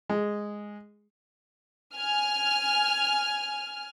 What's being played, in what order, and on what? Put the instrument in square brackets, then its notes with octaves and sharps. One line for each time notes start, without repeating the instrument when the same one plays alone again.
[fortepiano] G#3
[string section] G#5 F6